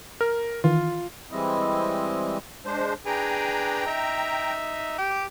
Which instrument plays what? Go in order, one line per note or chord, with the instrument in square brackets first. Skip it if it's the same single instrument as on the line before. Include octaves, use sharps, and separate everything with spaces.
[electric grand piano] A#4 [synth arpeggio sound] F6
[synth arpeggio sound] D#3 E3 [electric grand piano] F4
[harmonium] E3 G3 G#3 C4 E4 D#5
[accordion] G#3 D4 C5
[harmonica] D4 G#4 B4 [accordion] G5 A#5
[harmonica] D#4 E5
G4 G5